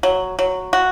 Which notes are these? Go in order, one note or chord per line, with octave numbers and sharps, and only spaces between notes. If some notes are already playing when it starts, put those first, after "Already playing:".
F#3
F#3
F#4